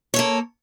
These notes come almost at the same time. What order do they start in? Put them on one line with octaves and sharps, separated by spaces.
C#5 A4 A#3